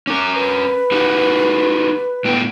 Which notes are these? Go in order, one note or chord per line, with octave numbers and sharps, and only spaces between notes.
C#4 A#4 D6
B4
D#4 F#4 G4
A2 B3 G5